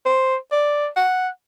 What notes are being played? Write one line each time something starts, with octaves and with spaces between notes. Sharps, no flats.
C5
D5
F#5